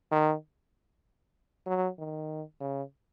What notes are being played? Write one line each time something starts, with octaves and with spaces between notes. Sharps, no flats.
D#3
F#3
D#3
C#3